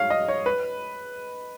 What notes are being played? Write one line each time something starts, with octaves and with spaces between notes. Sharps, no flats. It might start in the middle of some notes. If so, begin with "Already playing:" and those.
Already playing: C#5 F5
D#5
C#5
B4